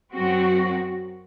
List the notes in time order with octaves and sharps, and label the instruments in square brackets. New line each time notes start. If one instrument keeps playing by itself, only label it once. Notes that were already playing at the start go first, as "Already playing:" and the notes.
[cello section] F#2 F#3 C4 F#4